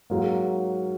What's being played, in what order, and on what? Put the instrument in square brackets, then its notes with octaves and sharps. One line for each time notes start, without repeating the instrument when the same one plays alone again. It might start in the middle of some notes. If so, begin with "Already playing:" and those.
[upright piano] G#2 F#3 A#3